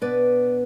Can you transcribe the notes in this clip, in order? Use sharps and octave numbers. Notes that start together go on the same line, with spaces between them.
B2 B3 D4 B4 D5